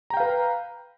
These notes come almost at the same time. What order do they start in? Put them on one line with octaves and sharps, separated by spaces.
A#5 G5 F5 B4